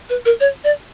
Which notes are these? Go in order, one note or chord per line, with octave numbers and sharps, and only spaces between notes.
B4
A#4
C#5
D5